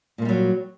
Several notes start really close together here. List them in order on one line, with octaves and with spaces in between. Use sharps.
A#2 A3 G3 F#3